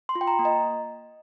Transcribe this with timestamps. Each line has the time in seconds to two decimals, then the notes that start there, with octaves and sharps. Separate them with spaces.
0.09 C6
0.15 F4
0.21 G5
0.27 A#5
0.39 A#3
0.45 D#5